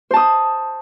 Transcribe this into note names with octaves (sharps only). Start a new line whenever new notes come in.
C5 A5 D#6